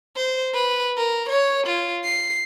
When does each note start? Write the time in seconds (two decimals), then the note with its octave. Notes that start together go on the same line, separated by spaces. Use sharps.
0.16 C5
0.54 B4
0.97 A#4
1.29 C#5
1.67 F4
2.04 C7